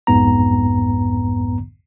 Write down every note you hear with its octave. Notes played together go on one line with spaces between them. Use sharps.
B1 F2 G#2 B3 A#5